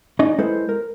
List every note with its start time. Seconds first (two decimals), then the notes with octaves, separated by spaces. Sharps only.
0.19 C#4 D#4 D5 D#5
0.38 G#3 E4 A4 B4 C5
0.69 A#4